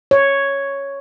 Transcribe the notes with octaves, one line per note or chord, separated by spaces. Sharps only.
C#5